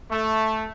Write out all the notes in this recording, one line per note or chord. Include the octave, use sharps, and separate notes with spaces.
A3